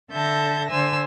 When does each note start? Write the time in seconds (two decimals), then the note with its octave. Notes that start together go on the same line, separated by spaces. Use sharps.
0.11 D3 A4 E5 A5 G6 A#6
0.69 D3 C5 G#5 E6